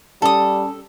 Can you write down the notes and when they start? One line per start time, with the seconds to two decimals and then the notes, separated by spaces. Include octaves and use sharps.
0.22 G3 C#4 A4 A5 D#6